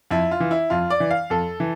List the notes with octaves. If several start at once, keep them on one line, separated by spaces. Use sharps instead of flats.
F2 E4
F4
E3
E4
F2 F4
D5
E3
F5
F2 A4
E3